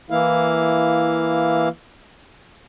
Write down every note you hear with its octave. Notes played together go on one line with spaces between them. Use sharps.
E3 A#3 E4 F5